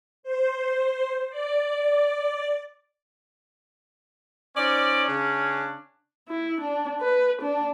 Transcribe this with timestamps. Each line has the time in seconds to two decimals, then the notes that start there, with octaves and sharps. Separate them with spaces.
0.23 C5
1.30 D5
4.57 C#4 D#4 C5 D5
5.07 C#3 D4
6.29 E4
6.61 D4
7.02 B4
7.42 D4